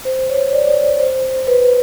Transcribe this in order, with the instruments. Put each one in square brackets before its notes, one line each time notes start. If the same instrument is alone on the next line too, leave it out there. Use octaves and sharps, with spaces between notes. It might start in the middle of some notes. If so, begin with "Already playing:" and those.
[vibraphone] C5
C#5
D5
C5
B4